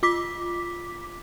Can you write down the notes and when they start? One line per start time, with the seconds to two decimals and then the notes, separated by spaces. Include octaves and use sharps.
0.03 F4 D6 B6